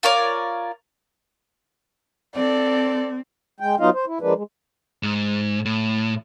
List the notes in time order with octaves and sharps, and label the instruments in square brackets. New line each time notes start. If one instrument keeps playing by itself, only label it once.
[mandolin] F4 A#4 C#5 D5
[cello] C4 [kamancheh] A4 D5
[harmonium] G#3 G5
F#3 B3 D#4 F4 D#5 F5
C5
E4
F3 G#3 A#3 D4 B4
G#3
[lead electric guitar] G#2
A2